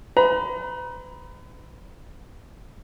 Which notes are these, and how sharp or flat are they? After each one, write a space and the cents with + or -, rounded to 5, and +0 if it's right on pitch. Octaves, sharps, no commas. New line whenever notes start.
B4 +40 A#5 +35